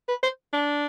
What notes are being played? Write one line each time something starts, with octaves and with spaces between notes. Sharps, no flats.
B4
C5
D4